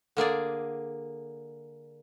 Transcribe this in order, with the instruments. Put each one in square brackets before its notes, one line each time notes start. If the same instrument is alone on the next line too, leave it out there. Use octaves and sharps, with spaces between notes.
[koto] D3 A#3 G#4 D5